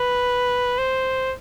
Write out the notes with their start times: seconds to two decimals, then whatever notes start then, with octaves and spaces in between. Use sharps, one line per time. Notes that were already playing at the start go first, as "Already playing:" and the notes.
Already playing: B4
0.78 C5